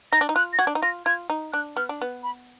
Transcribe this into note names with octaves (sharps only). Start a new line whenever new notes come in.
D#4 A#6
D4
D#4
F4 F#6
A#6
F#4 G#6
D4
D#4
F4 A#6
F4 G#6
D#4
D4 F#6
B3 F6
D4
B3
B5